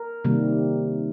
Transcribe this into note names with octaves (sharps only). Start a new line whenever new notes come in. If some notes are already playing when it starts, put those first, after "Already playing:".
Already playing: A#4
C3 D#3 G3 A#3